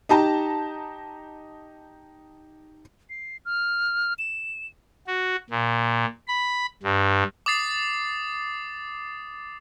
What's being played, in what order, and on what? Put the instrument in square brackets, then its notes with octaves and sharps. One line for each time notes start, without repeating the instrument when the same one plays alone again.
[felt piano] D#4 G4 A5 A#5
[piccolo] C7
F6
E7
[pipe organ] F#4
A#2
B5
G2
[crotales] D6 D#6 A6 C7